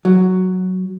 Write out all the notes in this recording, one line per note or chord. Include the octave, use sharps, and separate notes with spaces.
F#3